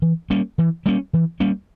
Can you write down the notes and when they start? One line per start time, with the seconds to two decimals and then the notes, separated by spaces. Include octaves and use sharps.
0.02 E3
0.30 G3 A#3 C#4
0.58 E3
0.86 G3 A#3 C#4
1.13 E3
1.40 G3 A#3 C#4